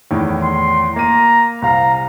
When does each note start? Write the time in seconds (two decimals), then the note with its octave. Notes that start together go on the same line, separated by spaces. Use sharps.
0.11 E2 A2 D#3
0.44 C6
0.96 A#3 A#5 D#7
1.62 C2 F5 A#5